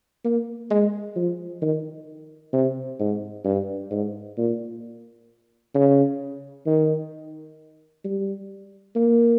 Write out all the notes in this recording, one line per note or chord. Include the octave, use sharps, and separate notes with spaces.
A#3
G#3
F3
D#3
C3
G#2
G2
G#2
A#2
C#3
D#3
G3
A#3